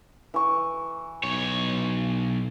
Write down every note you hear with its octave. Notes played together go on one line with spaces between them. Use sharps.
E3 C#6
B1 C#5